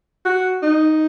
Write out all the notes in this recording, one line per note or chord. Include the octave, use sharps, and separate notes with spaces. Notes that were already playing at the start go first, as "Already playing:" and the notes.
F#4
D#4